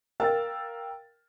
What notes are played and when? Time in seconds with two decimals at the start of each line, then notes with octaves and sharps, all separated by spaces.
0.20 A#4 F5 G5 E6 A6